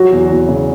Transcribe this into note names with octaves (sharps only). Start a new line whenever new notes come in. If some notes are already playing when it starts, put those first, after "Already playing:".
Already playing: F#3 F#4
E2
E2
C#3